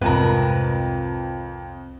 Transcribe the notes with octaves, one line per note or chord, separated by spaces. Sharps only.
C2 F2 G#2 A#4 B4 A5 A#5